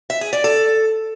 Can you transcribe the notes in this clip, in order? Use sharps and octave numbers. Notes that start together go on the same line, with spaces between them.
E5
G#4
D5
A4